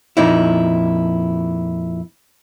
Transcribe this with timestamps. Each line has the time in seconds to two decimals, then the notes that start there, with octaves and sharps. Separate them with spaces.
0.17 F2 A#2 D#4 E4